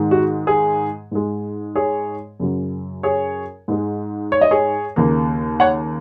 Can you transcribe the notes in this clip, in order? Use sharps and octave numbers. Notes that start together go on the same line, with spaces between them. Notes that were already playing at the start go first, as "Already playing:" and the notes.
Already playing: G#2 D#3 G#3
F#4
G#4
G#2 G#3
G#4 C#5
F#2 C#3 F#3
G#4 C#5
G#2 G#3
C#5
D#5
G#4 C#5
D#2 C#3 A#3
C#5 F#5